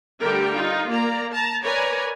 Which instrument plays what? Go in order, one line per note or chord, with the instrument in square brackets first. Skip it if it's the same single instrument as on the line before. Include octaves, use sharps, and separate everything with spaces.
[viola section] D3 G3 A3 G4 A#4 G5
D#4 F4
A#3 D5 A#5
A5 A#5
A#4 B4 C#5 D5 G#5 A#5